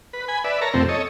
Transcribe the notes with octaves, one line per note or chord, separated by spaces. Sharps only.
B4
G#5 B5
B4 D5 E5
A#4 C#5 A5 A#5
F2 C3 A3 C4
A4 C#5 D#5